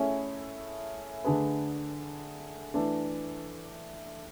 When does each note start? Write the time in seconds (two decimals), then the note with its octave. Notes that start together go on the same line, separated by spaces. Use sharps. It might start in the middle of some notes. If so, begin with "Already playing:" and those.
Already playing: A3 C#4 E4 G#4
1.25 D3 A3 D4 G#4 B4
2.74 E3 A3 D4